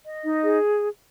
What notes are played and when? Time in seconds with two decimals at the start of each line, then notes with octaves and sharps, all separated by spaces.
0.05 D#5
0.24 D#4
0.43 G#4